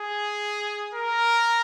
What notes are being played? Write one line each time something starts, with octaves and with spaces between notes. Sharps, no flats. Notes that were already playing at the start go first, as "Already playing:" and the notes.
Already playing: G#4
A#4